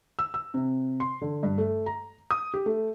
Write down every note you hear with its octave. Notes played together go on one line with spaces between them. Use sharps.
E6
E6
C3
C6
D3
G2
A3
A#5
D#6
G4
A3